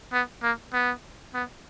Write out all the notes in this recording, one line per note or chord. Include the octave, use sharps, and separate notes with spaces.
B3
A#3
B3
B3